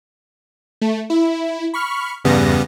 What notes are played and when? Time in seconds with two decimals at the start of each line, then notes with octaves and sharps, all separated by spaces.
0.81 A3
1.10 E4
1.74 B5 C#6 F6
2.25 E2 G2 C#3 G3 B3 A#6